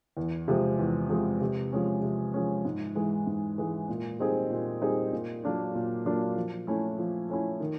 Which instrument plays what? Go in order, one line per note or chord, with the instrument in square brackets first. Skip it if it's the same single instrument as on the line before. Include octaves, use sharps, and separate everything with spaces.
[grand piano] E2
C3 F3 G#3 C4
E2
C3 F3 G#3 C4
C3
F3 G#3 C#4
C3
F3 G#3 C#4
G#2
E3 G#3
G#2
E3 G#3
A#2
G3 C4 D#4 G#4
A#2
G3 C4 D#4 G#4
A#2
F#3 A#3 D4 F4
A#2
F#3 A#3 D4 F4
F3
A3 C#4 E4
F3
A3 C#4 E4
D#3